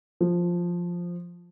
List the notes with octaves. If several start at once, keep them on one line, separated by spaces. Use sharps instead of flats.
F3